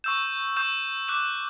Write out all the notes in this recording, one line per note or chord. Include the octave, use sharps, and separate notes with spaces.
C#6 E6 G6 E7
C#6 E6 G6 E7
D6 F#6 E7